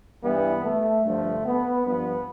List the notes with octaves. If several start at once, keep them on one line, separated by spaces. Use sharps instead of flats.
G2 E3 G3 B3
A3
G2 D3 F3 A3
B3
G2 F3 B3